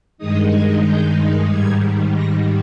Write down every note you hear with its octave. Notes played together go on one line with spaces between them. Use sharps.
G2 D#3 G#3 D#4 D#6
G#6
G6
G#2 D#3 G3 G#6
A#6